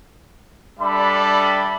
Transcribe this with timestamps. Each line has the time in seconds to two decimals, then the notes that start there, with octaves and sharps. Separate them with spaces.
0.80 G3 D4 A4 E5 B5